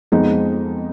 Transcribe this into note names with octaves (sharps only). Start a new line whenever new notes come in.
F2 F3 G#3 B3 D#4